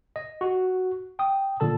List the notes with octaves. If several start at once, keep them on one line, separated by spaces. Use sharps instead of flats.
D#5
F#4
G5 D#6
A#2 D3 A4 A5